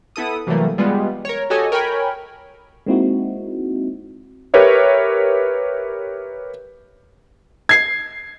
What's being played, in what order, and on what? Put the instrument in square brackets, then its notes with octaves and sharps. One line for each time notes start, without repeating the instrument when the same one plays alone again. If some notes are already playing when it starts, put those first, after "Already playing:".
[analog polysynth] B3 E4 A4 D#6
C3 E3 F#3 G3 A3 A#3
G3 G#3 B3 F4
A#4 C#5
F#4 G4 A4 C#5 D#5 G#5
A#4 C#5 G5 G#5 B5
[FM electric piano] G#3 A#3 C4 D#4 E4 F#4
[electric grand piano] G4 A#4 B4 C#5 E5
[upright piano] G#6 C7